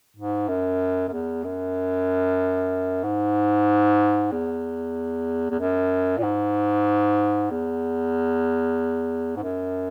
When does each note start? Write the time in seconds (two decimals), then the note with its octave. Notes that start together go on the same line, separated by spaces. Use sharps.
0.17 G#2
0.48 F#2
1.08 F#2
1.12 E2
1.44 F#2
3.04 G#2
4.31 E2
5.50 E2
5.60 F#2
6.18 A#2
6.23 G#2
7.51 E2
9.36 G#2
9.43 F#2